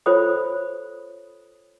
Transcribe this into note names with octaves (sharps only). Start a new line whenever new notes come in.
F4 A4 C5 C#5 B5 D#6